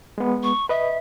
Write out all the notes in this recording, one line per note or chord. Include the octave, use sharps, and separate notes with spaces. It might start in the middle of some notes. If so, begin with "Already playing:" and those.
G#3 B3
C#6
B4 D#5 E5